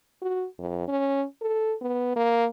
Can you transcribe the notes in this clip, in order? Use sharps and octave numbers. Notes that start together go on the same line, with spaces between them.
F#4
F2
C#4
A4
B3
A#3